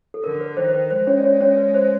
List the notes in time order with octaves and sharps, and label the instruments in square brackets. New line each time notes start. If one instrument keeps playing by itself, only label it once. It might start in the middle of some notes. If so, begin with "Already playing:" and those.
[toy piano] A4
[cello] D3 [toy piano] A#4
[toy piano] B4
[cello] D#3 [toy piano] C5
[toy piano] C5
B4
[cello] G#3 [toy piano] C5
[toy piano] C#4 C#5
D5
C#4 C#5
C#4 C#5
B4
C5